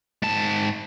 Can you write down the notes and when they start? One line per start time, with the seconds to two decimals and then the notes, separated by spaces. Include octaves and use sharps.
0.22 G#2 A5